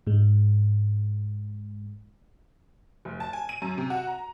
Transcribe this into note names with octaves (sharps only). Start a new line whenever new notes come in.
G#2 G#3
F1
A5
G#5
D#7
F#2
C3
F#4
A#5